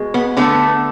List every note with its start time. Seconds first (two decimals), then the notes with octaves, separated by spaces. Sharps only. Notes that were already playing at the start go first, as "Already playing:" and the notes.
Already playing: B2 G#3
0.14 B3
0.37 D3 A3 B3